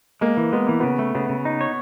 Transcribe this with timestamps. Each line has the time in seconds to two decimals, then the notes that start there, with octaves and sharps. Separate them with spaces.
0.21 G#3 A#3
0.37 E3
0.52 G#3 B3
0.67 E3 A#3
0.80 C#3 B3
0.99 A3
1.15 C#3 B3
1.29 C#3
1.45 D#4
1.61 C#5